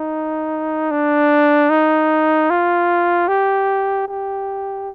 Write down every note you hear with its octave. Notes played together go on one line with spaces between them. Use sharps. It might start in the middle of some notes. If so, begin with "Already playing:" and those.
Already playing: D#4
D4
D#4
F4
G4
G4